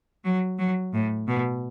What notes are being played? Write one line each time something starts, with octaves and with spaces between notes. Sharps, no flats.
F#3
F#3
A2
B2